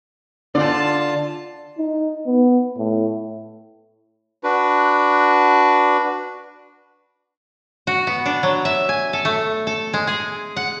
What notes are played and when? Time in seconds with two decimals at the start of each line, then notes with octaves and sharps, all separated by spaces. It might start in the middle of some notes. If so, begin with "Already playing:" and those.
0.55 D3 F4 D5 A5
1.78 D#4
2.26 B3
2.77 A2
4.43 D4 F#4 B4
7.87 F#4
8.07 B3
8.26 D4
8.43 F#3
8.65 E5
8.89 G#5
9.13 A4
9.25 A3
9.67 A4
9.93 G#3
10.07 G#4
10.56 F#5